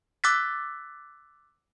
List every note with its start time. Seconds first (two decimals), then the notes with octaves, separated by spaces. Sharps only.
0.24 D6 E6 F#6 A6 B6